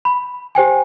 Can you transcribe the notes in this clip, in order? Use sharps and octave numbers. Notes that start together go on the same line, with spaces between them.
B5
G4 C5 G5 G#5